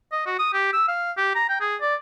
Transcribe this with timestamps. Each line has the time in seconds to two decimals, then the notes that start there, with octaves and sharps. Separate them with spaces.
0.13 D#5
0.26 F#4
0.39 D#6
0.53 G4
0.73 E6
0.88 F5
1.17 G4
1.35 A#5
1.49 G5
1.61 G#4
1.81 D5